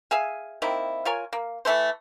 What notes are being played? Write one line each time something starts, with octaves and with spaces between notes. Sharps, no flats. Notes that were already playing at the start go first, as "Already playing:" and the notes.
G#4 E5 F5 G#5
D#3 A#3 C4 E4
F4 A#4 C#5 G#5
A#3
E3 A3 A4 C5